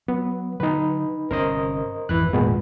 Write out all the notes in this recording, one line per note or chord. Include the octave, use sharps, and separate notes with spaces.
F#3 B3
D3 F#3 D#4 B4
G1 C3 C#4 A#4 C5 D#5
G#1 F2 E3 B4 F#6
A#2 G#3 B3